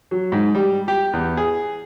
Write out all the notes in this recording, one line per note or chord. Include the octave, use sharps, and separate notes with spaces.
F#3
G#2
G3
G4
E2
G#4